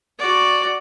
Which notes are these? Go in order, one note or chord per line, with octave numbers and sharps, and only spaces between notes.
F#4 D5